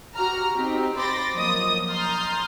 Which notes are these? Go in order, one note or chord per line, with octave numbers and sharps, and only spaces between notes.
F#4 G4 A#5 F6
C4 D#4 G4
C5 B5 C6 D6 A6 A#6
F3 F#3 A#3 D#5 D#6
A#5 C6 D#6 F6 G6 A6